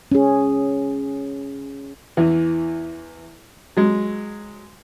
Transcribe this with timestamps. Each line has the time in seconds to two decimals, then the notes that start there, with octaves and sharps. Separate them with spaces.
0.12 C#4 G#4
2.17 E2 E3
3.77 F#3 G#3